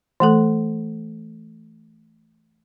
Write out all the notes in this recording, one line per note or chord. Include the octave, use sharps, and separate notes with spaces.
E3 A3 A4